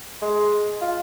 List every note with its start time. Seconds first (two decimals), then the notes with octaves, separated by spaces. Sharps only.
0.22 G#3
0.81 F4